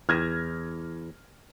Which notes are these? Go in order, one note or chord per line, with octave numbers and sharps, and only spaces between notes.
E2 F6 G#6 A#6